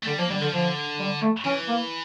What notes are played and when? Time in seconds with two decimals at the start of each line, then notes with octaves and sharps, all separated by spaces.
0.03 A3
0.07 D3 G3
0.18 F3 A#3
0.30 D3 G3
0.41 D3 F3
0.53 D3 F3
0.99 G3
1.22 A3
1.45 E3 C#4
1.68 A#3